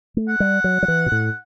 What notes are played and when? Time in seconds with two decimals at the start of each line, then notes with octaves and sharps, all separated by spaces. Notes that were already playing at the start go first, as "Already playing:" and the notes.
0.17 A3
0.28 F#5
0.40 G3
0.64 F#3
0.83 F#3
0.88 E3
1.06 B2
1.12 A2